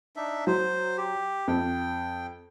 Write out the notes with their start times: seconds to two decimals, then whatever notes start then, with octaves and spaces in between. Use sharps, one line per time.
0.16 D4 D#4 E5
0.47 F#3 C5
0.98 G4
1.48 F2 G5